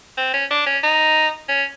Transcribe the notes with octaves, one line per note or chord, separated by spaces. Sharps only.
C4
C#4
D4
C#4
D#4
C#4